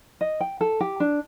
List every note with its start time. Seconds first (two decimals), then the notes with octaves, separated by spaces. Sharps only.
0.21 D#5
0.41 G5
0.61 A4
0.81 G4
1.00 D4